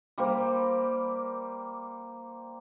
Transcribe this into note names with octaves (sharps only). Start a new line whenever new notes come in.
G3 A#3 C5